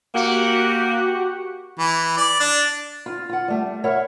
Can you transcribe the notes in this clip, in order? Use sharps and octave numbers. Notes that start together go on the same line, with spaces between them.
A#3 F#4 G4 F#5
E3
D5
D4
F4
F4 F#5
G3 A3
E4 A#4 C#5 E5 F#5